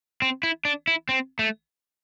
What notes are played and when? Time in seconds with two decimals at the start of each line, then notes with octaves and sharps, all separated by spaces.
0.22 C4
0.43 E4
0.65 D4
0.87 E4
1.09 C4
1.39 A3